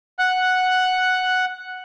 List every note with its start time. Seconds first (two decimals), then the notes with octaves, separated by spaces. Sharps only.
0.19 F#5 F#6